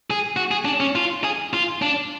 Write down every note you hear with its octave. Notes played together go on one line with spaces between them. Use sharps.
G#4
F#4
G#4
D4
C#4
F4
G#4
F4
D4